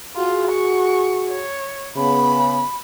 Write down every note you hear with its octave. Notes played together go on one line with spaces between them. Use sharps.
F4 F#4 G#4
C#6
C#5
C#3 B3 B5